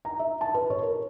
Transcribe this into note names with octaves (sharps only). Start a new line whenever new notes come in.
A#5
E5
A5
B4
C#5
A#4